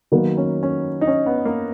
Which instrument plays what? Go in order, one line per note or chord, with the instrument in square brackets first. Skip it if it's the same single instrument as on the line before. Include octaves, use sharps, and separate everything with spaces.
[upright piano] D#3 F#3 A#3 [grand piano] B3
[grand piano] C#4
C#4
D#4
C#4
B3
A#3